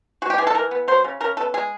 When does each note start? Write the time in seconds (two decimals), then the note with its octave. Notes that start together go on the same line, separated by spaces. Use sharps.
0.22 G#3 F#4
0.30 G4
0.38 E3 G#4
0.47 A4
0.55 E3 A#4
0.71 B3
0.88 F#3 C5
1.04 C#3
1.20 C#3 A#4
1.37 B3 A4
1.54 G#3 G#4